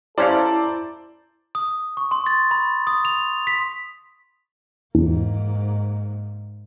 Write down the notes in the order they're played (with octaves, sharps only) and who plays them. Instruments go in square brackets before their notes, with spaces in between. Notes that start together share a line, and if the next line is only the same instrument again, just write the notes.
[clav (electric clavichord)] G3 C#4 F5 [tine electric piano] E4 A#5 [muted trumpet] A4 [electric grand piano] C5 D5
[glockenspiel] D#6
C#6
C6
A6
B5
D#6
F7
B6
[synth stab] E2 [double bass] G#2 A#3